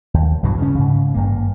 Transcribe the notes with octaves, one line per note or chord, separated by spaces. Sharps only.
D#2
B1 G2 E3 F#3
C#3 C#4
G#2 C#3
G#1 G2 A#3